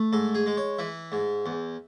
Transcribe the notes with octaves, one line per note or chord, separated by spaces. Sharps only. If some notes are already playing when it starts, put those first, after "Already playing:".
Already playing: A3
G#2 A4
G#4
G#3
C#5
E3 E5
G#2
E2